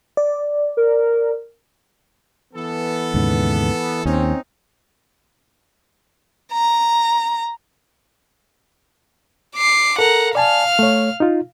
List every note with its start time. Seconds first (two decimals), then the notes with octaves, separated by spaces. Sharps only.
0.17 D5
0.77 A#4
2.54 E3 B3 A4
3.14 D#2 G#2 C#3
4.06 D#2 C4 C#4 D#4
6.53 A#5
9.55 D6 C7
9.98 A4 A#4 F#5 A#5
10.35 D5 F5 G#5 A5 F6
10.79 A3 C#5
11.20 D#4 F4